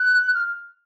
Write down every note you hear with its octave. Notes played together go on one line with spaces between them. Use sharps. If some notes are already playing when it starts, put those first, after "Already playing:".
Already playing: F#6
F6